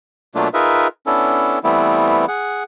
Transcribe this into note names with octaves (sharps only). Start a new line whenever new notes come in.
B2 F#3 A3 A#3 D4 F4
D#4 F4 G#4 A#4 B4 E5
B3 C#4 D4 E4 A4
E3 G3 A3 B3 C4 E4
G#4 F#5